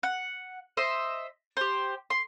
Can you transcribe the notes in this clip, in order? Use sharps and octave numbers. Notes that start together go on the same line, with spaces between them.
F#5
C5 D#5 E5
G4 C5
C6